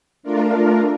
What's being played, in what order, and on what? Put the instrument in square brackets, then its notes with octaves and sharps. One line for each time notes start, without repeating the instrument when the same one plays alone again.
[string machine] A3 D4 F4 A#4